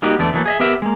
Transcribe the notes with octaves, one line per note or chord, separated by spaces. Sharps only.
G3 A#3 D#4 F#4 G4
E2 D3 A3 D5
D3 E3 F#3 A3 A#3
G#4 D#5 E5
B3 G4 A#4 E5
G#3 A#3